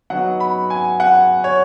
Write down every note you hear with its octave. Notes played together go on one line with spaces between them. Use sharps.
F#3 B3 D#4 F#5
B5
G#5
F#5
C#5